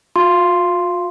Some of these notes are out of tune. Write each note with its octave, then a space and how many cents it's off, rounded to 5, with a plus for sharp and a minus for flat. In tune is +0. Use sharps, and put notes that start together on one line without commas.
F4 +45 F5 -20 C6 +0